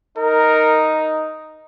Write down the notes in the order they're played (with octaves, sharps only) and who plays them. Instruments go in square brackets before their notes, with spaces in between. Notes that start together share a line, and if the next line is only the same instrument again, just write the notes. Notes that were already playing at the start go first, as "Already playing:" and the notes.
[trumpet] D#4 [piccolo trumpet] A#4